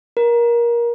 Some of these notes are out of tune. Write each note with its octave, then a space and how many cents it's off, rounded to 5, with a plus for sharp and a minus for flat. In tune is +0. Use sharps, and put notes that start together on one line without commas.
A#4 +20